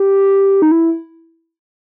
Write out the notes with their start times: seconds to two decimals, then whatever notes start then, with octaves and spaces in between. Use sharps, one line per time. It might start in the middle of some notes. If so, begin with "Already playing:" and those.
Already playing: G4
0.62 D#4
0.71 E4